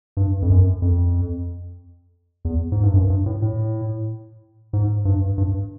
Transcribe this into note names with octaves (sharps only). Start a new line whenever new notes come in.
G2
F2
F#2
F2
E2
G#2
G2
F#2
G2
A2
A2
G#2
G2
G2